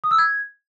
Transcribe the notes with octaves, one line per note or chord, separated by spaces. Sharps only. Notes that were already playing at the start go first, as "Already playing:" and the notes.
D#6
E6
G#6